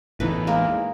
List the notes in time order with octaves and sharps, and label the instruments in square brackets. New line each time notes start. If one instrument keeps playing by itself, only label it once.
[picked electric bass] A1 E2 E3 [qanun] D#4 A4 B4
[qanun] G#3 A#3 A#4